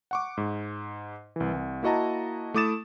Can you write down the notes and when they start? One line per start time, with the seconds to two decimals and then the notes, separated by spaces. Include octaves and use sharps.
0.11 F#5 C#6 D6
0.37 G#2
1.36 C2 E3
1.53 C2
1.83 A#3 E4 F#4 D#5 A5 A#5
2.54 A3 E4 D6 D#6 A6 E7